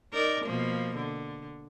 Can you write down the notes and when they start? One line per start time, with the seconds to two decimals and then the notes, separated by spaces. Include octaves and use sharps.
0.13 D#4 A#4 D5
0.44 B2 F3 A#3
0.96 D3